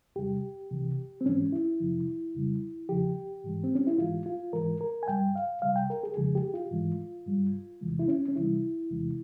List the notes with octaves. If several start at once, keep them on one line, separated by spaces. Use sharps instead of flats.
E2 C3 G3 G4
C2 C3 E3
C4
G#2 E3 G#3 C#4
E4
F2 C3 F3
F2 C#3 G3
E2 C#3 F3 G4
G#2 E3 G#3
C4
C#4
E4
G#2 E3 G#3 F4
F4
G#2 E3 G#3 A#4
A#4
G#5
G2 G3 G5
F5
C2 C3 G3 F5
G5
A#4
G#4
F2 C#3 F3 G#3 G#4
G4
F4
G#2 E3 G#3
G2 G3
E2 C3 E3 G#3
E4
C#4
C#4
C#2 C3 E3 G3 E4
E2 C3 E3 G#3